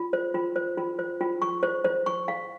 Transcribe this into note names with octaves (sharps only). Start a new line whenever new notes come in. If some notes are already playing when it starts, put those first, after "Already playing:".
Already playing: F4
C5
F4
C5
F4
C5
F4
C#6
C5
C5
C#6
F5